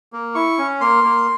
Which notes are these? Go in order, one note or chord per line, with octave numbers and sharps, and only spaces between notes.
A#3
E4 C#6
C#4
A#3 C6
A#3